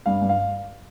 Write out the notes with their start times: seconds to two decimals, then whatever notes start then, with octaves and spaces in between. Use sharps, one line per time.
0.06 G2 F5
0.22 G2
0.29 F5